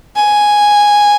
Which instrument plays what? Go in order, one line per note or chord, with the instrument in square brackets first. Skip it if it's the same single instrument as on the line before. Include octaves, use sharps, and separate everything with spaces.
[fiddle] G#5